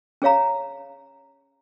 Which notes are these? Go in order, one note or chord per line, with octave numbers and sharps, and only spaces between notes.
C#4 G#4 C#5 F5 A#5